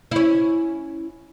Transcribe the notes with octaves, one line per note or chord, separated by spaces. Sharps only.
C#4 E4